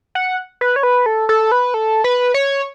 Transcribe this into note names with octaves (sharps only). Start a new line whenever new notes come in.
F#5
B4
C#5
B4
A4
A4
B4
A4
B4
C#5